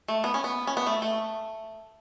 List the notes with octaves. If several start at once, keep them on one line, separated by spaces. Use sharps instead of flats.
A3
B3
C#4
B3
C#4
B3
A3
A3